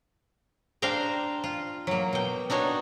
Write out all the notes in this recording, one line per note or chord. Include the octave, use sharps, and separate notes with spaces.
D4 C5 F5 G5 A#5
F4
F#3 A#3
B2 G5
D4 D#4 F#4 C#5